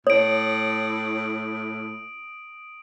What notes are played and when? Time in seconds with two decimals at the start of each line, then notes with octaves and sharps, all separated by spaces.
0.07 A2 C#5 D#6 D7